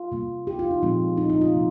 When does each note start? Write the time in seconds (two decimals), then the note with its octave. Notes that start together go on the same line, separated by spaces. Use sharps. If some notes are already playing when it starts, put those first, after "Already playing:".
Already playing: F4
0.12 C3 G3 A#3
0.47 G4
0.59 F4
0.71 D#4
0.82 A#2 F3 G#3 C4
1.17 D#4
1.30 D#4
1.41 F4
1.53 C3 F3 A#3